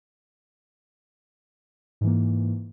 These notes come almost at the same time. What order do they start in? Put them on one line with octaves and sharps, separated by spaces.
G#2 E3 A#3